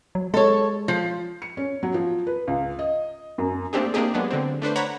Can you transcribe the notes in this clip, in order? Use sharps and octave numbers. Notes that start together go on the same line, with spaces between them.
F#3
G#3 A4 C#5
F3
C#7
C#4
F#3
F3
B4
C#2
D#5
F#2
A3 A#3 C4 D4 G4 G#4
A#3 C4 D4 D#4 G4 G#4
F#3 G#3 B3 D4
D3 C4
A3 D4 B4 C5
C#5 F#5 A#5 B5